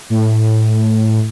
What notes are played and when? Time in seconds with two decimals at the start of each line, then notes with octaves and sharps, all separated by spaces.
0.10 A2